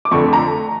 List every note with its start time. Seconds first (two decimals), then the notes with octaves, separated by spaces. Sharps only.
0.05 D6
0.11 F2 D3 A3 C#6
0.33 A#5